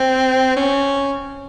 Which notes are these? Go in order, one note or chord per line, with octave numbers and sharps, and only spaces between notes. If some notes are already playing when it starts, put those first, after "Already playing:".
Already playing: C4
C#4